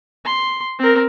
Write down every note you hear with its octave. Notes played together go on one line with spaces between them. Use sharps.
C6
C4 A#4